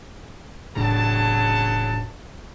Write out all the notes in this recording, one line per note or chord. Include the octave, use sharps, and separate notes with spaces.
E1 A2 C#3 F#3 D4 A5